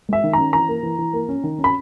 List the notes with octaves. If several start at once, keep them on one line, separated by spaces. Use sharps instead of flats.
G#3 E5
D#3
C#4 A#5
E3 A#5
A#3
E3
E3
A#3
C#4
D#3
C#4
B5